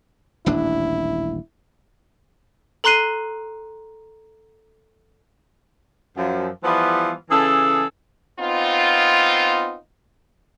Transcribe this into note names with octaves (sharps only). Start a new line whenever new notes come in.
D#1 A1 D4 E4
A4 A#5 C6 F#6 C7 D#7
F#2 F3
E3 F3 G3 B3 E4 F4
C#3 E3 G#4 A4
B3 C4 D#4 F4